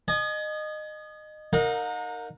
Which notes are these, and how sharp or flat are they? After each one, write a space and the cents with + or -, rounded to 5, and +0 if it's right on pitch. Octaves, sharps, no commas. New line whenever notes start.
D#5 -20 G#5 +35
D#4 +0 A#4 -15 F#5 -45